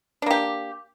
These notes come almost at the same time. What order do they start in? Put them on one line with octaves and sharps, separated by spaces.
D4 A#3 G4